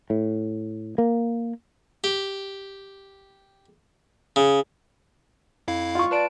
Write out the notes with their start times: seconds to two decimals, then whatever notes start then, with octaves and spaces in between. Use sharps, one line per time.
0.10 A2
0.98 A#3
2.04 G4
4.36 C#3
5.68 F2 E4 F5
5.95 F4 C#6
6.11 B4 D5 A5 D7